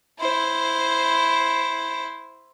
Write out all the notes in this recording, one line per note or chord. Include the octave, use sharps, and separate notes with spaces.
E4 C5